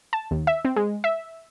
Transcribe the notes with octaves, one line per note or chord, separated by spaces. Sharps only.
A5
D#2
E5
C4
G#3
E5